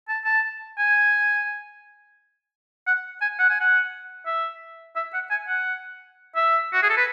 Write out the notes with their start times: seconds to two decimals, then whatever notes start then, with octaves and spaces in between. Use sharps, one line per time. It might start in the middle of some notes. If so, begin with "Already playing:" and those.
0.09 A5
0.25 A5
0.78 G#5
2.87 F#5
3.22 G#5
3.39 F#5
3.49 G#5
3.61 F#5
4.26 E5
4.96 E5
5.14 F#5
5.31 G#5
5.48 F#5
6.36 E5
6.73 F#4
6.83 G#4
6.90 A4
6.97 B4